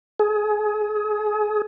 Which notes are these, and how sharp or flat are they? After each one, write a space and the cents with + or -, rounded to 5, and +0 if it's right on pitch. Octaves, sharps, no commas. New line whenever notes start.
G#4 +30